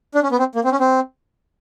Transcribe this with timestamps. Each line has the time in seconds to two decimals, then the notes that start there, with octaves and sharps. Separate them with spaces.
0.15 D4
0.23 C#4
0.32 B3
0.39 C4
0.55 A#3
0.65 C4
0.72 C#4
0.80 C4